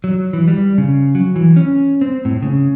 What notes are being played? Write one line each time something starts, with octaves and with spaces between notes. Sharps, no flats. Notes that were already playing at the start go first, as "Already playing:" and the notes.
F#3
E3
G3
C#3
F#3
E3
C#4
C4
A2
C#3